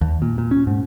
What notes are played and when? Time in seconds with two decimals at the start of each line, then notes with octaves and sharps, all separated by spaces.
0.01 D#2
0.22 A#2
0.38 A#2
0.51 C#4
0.67 G#2